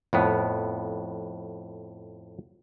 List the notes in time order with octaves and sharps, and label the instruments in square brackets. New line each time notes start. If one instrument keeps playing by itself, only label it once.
[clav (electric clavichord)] F2 A2 B3